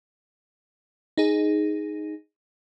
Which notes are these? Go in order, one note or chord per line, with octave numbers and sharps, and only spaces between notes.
D#4 G#4